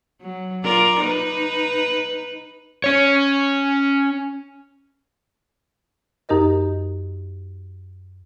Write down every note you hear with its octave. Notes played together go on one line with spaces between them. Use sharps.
F#3
F4 A#4 D5
D#4 B4
C#4 C#5
F#2 D#4 G4 A#4 D#5